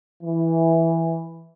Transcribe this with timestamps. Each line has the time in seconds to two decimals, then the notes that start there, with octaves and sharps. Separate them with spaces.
0.23 E3